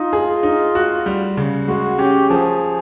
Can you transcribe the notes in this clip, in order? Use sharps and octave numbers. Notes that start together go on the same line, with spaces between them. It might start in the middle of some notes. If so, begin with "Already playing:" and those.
Already playing: D#4 F4
G#4
D#4
F#4
G3
C#3
G#3 F#4
C#4 G4
F3 G#4